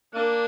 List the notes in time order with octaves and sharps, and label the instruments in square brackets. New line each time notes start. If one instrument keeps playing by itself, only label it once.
[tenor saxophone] A#3 [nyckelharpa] D4